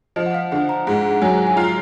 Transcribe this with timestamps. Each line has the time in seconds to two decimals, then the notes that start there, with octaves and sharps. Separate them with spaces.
0.16 F3 D#5
0.26 F#5
0.34 F5
0.52 D3 F#5
0.69 A#5
0.87 G#2 F#5
1.11 F#5
1.22 F#3 G#5
1.47 G#5
1.56 F4 A#5